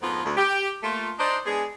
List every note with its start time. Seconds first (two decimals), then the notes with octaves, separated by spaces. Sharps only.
0.02 F2 G#2 F3 A#3 B3 F4
0.24 D2
0.37 G4
0.83 A3 A#3 F4
1.19 D4 D#4 C5
1.45 G#3 B3 D4 G#4